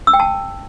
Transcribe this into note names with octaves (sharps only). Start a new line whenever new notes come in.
E6
G5
A5